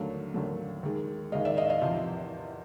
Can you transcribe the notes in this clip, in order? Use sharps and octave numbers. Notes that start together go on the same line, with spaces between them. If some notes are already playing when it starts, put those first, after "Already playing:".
Already playing: D#2 D3 F#3 A3 F5
D#2 D3 F#3 A3
D#2 D#3 G#3
D#2 D#3 G#3 D#5 F5
D5 E5
D#5 F5
D#5 F5
E2 C3 F3